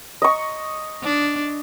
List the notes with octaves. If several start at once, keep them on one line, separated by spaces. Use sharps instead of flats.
D#5 C#6
D4